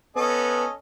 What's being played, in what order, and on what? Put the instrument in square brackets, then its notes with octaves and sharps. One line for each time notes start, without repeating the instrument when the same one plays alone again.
[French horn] B3 [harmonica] C#4 A4 D#5